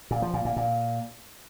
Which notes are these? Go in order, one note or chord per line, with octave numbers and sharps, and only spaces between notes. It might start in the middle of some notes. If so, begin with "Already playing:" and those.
A#2
F3
A#2
A#2
A#2